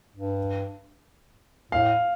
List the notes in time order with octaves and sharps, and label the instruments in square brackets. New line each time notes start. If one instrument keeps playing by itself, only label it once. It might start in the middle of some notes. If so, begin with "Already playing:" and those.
[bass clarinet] G2
[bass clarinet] A2 [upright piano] F5